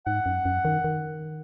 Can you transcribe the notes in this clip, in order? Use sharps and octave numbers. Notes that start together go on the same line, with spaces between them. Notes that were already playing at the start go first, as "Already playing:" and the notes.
G#2 F#5
F#2
F#2
D#3
D#3